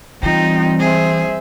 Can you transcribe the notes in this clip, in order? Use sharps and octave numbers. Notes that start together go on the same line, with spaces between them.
E3 G3 C4 D#4 F4 G5
G#4 C5 E5